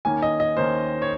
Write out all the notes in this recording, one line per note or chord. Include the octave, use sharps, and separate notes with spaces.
D#2 D#3 A#3 C#4 G#5
D#5
D#5
D#2 D#3 A#3 C#4 C5
C#5